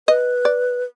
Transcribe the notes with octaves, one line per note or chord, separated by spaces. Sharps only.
B4 D#5
D5